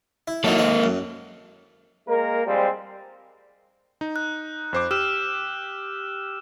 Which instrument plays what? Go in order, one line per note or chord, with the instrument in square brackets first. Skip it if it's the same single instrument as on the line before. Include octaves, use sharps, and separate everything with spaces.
[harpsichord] E4
[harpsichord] F#3 D#4 E4 [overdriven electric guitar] A#3 A4
[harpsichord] D#3 C4 D#4
F#2
[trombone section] G#3 A#3 A#4
F3 G3 G#3 C4
[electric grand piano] D#4
[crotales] F#6
[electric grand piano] F2 C5 D6
[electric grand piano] G4 [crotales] E6 F6 E7